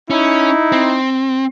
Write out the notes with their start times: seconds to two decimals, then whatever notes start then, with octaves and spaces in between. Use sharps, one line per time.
0.10 C#4 D#4 E4
0.72 C4